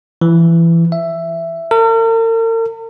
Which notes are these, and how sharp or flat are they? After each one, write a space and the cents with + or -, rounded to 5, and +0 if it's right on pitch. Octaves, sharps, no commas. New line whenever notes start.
E3 +20
E5 +10
A#4 -45